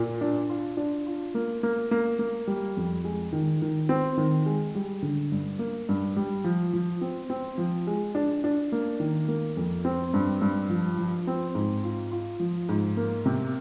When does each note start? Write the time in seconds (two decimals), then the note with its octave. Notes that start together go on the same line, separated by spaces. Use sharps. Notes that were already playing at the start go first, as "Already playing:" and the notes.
Already playing: A#2
0.21 D4
0.50 F4
0.77 D4
1.07 F4
1.35 A#3
1.63 A#3
1.91 A#3
2.19 A#3
2.47 G3
2.77 F2
3.04 G#3
3.32 D#3
3.62 D#3
3.89 C4
4.17 D#3
4.46 G#3
4.75 G3
5.02 D3
5.32 G2
5.59 A#3
5.89 G2
6.16 G3
6.44 F3
6.73 F3
7.01 C4
7.30 C4
7.58 F3
7.87 G#3
8.15 D4
8.44 D4
8.72 A#3
9.00 D#3
9.28 A#3
9.57 F2
9.85 C4
10.14 G2
10.42 G2
10.70 F3
10.99 F3
11.27 C4
11.55 G#2
11.83 F4
12.12 F4
12.40 F3
12.69 G#2
12.97 A#3
13.26 C3